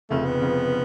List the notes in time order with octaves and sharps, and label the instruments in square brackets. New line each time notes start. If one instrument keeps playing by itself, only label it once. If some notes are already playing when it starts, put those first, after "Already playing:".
[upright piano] F1 F2 C#3 [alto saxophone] A3
[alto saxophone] B3
[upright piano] F1 F2 C#3